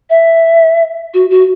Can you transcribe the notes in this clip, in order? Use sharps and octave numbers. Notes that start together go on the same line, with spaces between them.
E5
F#4
F#4